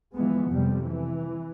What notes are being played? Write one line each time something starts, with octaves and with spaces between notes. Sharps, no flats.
E3 F3 G#3 B3
F2 C3 G3
E3